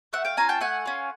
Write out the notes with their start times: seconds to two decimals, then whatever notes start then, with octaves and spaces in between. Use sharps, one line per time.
0.13 A3 E5 F#5
0.25 F5 G5
0.37 C#4 F4 G#5 A#5
0.49 G5 A5
0.60 A3 F#5 G#5
0.85 C#4 F4